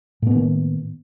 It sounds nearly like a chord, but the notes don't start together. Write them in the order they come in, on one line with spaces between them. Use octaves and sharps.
A2 B3 A#3 D#3